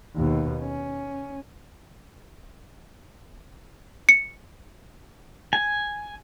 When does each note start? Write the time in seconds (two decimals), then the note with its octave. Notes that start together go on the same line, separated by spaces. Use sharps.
0.16 D#2 B2
0.62 C#4
4.09 C#7
5.53 G#5